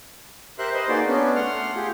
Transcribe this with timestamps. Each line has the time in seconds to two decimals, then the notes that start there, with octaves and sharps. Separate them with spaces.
0.59 G4 A#4 C5 E5 C6 F#6
0.74 B4 C5 D#5 C6
0.89 A#3 D#4 F#4 G#4 D5 C6
1.07 B3 C#4 D4
1.36 A3 F#5 C6 F6
1.75 F4 G4 G#4